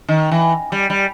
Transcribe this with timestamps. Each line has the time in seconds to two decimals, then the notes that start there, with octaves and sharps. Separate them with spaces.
0.09 D#3
0.32 E3
0.72 G3
0.90 G3